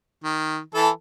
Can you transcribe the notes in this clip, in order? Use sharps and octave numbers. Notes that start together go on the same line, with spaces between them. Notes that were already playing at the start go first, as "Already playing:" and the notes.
D#3
E3 A4 A5